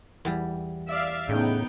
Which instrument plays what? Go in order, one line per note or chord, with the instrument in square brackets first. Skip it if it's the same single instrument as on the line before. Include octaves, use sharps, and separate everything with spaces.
[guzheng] E2 G3
[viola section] D5 E5 F5
[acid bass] A2 [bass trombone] C#3 [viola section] B3 D#4 G5